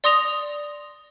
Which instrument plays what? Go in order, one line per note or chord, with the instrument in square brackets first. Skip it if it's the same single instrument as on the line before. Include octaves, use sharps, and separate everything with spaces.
[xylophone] D5 C6 D#6 A#6 F7